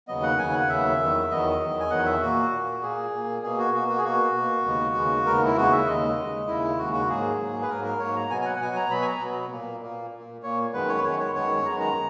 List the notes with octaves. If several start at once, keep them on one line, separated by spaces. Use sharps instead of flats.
D#2 C#3 F#3 B3 D#5
F#5
D#2 C#3 F#3 B3 G#5
F#5
D#2 C#3 F#3 B3 E5
E2 D#3 F#3 B3
E2 D#3 F#3 B3 D#5
E2 D#3 F#3 B3
G#5
E2 D#3 F#3 B3 F#5
E5
A#2 A#3 F#4
A#2 A#3
A#2 A#3 G#4
A#2 A#3
B2 A#3 G#4
F#4
B2 A#3 F#4
F#4
G#4
B2 A#3 F#4
B2 A#3
D#2 C#3 G#3 B3
D#2 C#3 G#3 B3
D#2 C#3 G#3 B3 A#4
E4
D#2 C#3 G#3 B3 F#4
E5
D#2 C#3 G#3 D#5
D#2 C#3 G#3
D#2 C#3 G#3 E4
D#2 C#3 G#3 F#4
F#4
G#2 F#3 A#3 G#4
G#2 F#3 A#3
B4
G#2 F#3 A#3 A#4
A#4
G#2 F#3 A#3 C#5
A#5
B2 F#3 B3 G#5
G#5
F#5
F#5
B2 F#3 B3 G#5
A#5
B2 F#3 B3 B5
G#5
A#5
B2 F#3 B3
A#2 A#3
A#2 A#3
A#2 A#3
A#2 A#3 C#5
F#2 D#3 G#3 B3 B4
C#5
B4
F#2 D#3 G#3 B3 C#5
C#5
F#2 D#3 G#3 B3 C#5
F#2 D#3 G#3 B3 A#5
A#5